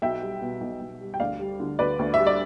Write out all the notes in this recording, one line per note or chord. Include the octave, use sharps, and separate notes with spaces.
B1 E5 G5
G3
B2
B1
B1
G3
G5
D2 D5 F5
G3
D3
D2 B4 D5
D2
E5
G3
D5